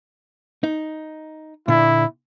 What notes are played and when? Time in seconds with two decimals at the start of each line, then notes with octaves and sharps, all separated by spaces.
0.64 D#4
1.68 A#2 D3 E4